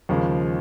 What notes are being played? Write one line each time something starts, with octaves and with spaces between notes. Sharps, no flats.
D#2 C#3 F3 G#3